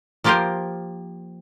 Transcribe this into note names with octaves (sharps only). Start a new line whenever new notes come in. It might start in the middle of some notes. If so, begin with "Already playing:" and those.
F3 A#3 F4 G4 A#4 C5